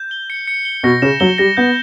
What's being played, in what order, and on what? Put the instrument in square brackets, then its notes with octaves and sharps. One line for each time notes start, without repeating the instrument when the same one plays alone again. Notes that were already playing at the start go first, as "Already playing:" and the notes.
Already playing: [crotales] G6
G7
C#7
C#7
G7
[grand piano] B2 [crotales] A#6
[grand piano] C#3 [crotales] E7
[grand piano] F#3 [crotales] G7
[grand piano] G3 [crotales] A#6
[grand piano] B3 [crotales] G6